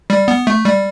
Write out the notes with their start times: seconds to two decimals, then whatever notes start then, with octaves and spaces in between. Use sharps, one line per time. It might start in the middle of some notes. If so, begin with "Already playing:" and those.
0.10 G3
0.28 B3
0.47 A3
0.65 G3